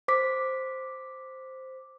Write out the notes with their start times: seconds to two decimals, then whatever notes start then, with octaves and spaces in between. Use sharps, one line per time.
0.08 C5 D6 B6